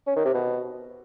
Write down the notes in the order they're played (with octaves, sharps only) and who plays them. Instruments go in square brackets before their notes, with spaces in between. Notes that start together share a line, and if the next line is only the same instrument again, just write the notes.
[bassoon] C#4
D#3
C3
B2